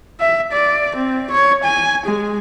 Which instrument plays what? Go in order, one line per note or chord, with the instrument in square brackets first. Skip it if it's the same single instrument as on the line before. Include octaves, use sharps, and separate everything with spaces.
[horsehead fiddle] E5
D5
C4
C#5
G#5
G#3